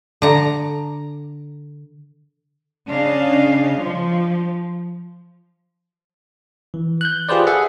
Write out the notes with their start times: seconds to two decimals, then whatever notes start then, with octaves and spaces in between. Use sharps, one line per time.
0.22 D3 A#5
2.91 C#3 D4 D#5 F5
3.80 F3
6.74 E3
7.01 F#6 G6
7.29 F4 G4 G#4 B4 C5 D5
7.47 G#4 A4 E5 F#5